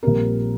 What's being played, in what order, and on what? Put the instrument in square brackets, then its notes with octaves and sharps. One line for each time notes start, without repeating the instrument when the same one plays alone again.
[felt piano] A#1 A#2 G3 C4 A#4